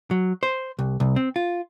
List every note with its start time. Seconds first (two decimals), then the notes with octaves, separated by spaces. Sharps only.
0.11 F#3
0.43 C5
0.79 C2
1.00 C2
1.16 C4
1.36 F4